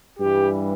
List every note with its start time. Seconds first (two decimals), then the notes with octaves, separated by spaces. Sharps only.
0.18 G2 E3 G3 G4